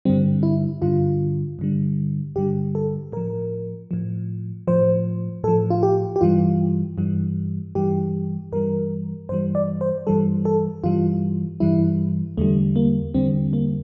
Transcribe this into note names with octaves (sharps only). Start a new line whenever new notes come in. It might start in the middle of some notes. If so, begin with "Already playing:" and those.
G2 D3 G3 C4
E4
G2 D3 G3 F4
G2 D3 G3
G2 D3 G3 G4
A4
A2 F3 A#4
A2 F3
A2 F3 C5
A2 F3 A4
F4
G4
G4
G2 E3 G3 F4
G2 E3 G3
G2 E3 G3 G4
G2 E3 G3 A#4
G2 E3 G3 C5
D5
C5
G2 E3 G3 A4
A4
G2 E3 G3 F4
G2 E3 G3 E4
E2 D3 G3 A3
A#3
E2 D3 G3 C4
A#3